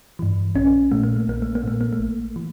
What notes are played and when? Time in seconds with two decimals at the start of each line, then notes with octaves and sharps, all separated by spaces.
0.19 G2 E3
0.55 A#1 C#4
0.92 A#2 A3
1.03 A#3
1.16 A3
1.28 A#1 A#3
1.42 A3
1.55 A#3
1.64 A#2 A3
1.81 A#3
1.93 A3
1.99 A1
2.36 E3